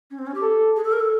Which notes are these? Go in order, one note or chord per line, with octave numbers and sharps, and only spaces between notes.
C#4
C4
C#4
G4
A4
G#4
A4
A#4
A4